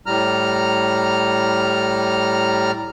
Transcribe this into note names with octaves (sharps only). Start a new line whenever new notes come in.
A2 G3 A#5 F6